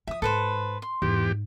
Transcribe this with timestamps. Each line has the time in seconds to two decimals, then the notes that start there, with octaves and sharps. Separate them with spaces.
0.07 F3 E5 D#6
0.22 G#2 A4 B4 C5
0.82 C6
1.02 E2 G#2 G4